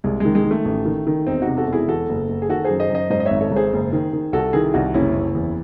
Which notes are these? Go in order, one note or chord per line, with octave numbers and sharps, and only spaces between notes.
C2 G#3
G#3
D#3
G#3
D#3
A3
A1
D#3
D#3
E1 C4 D#4
D#4 F#4
C3
F#4 A4
E1
E4 G#4
E2 F#4 A4
F#1
F#1
G#4
D#3 F#4 A4
F#2 G#4 C5
C5 D#5
F#2
C5 D#5
G#2 C5 D#5
D#5
G#1 C#5 E5
A4 C#5
G#2
G#4 C5
F#1
D#3
D#3
C2 F#4 A4
D#3 E4 G#4
C2 D#4 F#4
F#1 C#4 E4
F#1
E2